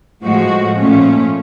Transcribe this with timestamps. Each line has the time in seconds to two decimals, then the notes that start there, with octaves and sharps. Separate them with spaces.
0.23 A2 F3 G#3 F#4
0.78 A#2 F3 A3 C#4